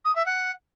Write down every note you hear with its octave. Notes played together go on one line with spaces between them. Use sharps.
D#6
E5
F#5